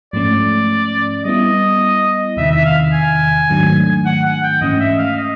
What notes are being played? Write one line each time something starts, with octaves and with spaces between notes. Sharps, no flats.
G#2 F3 A3 C#4 D5
G3 B3 E4 D#5
E2 C3 D#3 E5
E5
F5
G#5
G#2 D#3 F#3 A3 D4
F#5
F#5
G5
G#2 E3 A3 C#4 D#5
E5
F5
D#5